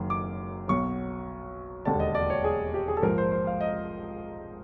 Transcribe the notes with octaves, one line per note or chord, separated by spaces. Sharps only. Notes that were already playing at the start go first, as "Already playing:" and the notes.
Already playing: F#1 F#2 D#3
D6
B1 B2 F#3 C#6
E1 D#2 D3 A5
D#5
D5
C#5
G#4
G4
G#4
A4
A#1 G#2 F3 A#4
C5
C5
F5
D#5